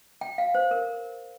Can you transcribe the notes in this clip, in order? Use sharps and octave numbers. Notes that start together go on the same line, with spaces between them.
G5
F5
C5
A#4